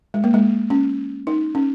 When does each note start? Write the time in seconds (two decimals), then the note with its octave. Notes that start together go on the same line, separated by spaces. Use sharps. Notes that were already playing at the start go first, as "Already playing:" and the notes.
0.14 G#3
0.24 A#3
0.34 G#3
0.70 C#4
1.27 D#4
1.55 C#4